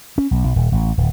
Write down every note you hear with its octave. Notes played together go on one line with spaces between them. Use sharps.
C#4
B1
B1
D#1
A1
D1